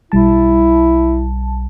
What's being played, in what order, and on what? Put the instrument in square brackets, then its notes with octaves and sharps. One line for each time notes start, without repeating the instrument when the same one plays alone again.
[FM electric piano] B1 G3 A5 [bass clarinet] E4